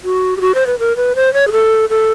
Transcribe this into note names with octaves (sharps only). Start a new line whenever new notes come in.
F#4
G4
F#4
C5
B4
A#4
B4
C5
C#5
G#4
A4
A4